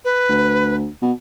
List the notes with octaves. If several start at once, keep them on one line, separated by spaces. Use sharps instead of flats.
B4
D2
B2